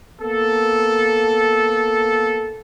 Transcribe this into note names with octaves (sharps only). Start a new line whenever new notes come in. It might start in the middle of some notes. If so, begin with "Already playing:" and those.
A#3 B3 A4